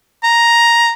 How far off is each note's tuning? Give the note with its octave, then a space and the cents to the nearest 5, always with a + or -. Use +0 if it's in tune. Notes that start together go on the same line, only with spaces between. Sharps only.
A#5 +5